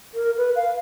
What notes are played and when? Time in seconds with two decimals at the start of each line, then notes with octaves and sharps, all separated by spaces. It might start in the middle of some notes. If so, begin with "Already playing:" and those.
0.14 A#4
0.38 B4
0.56 F5